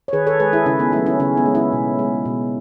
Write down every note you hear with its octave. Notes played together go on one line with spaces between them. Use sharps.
C#5
D#3 G#4 B4
A4 C#5
G#3 G#4 B4
E4 G#4
C#3 C#4 E4
B3 D#4
F#3 A3 C#4 E4
C#4 E4
C#3 C#4
B3 D#4
G#3
C#4 E4
B2
G#3
B2